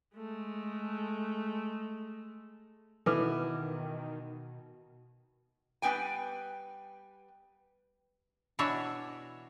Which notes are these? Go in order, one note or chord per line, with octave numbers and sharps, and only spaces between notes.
G#3 A3
B2 D#3 E3 A4 B4 D6
G3 B3 B4 G5 G#5
B2 E3 D4 F#4 C#5 E5